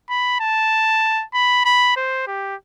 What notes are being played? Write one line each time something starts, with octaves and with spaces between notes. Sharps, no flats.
B5
A5
B5
B5
C5
G4